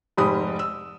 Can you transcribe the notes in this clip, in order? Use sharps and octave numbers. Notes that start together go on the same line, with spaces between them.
F1 G#2 G4 B5 D#6
E6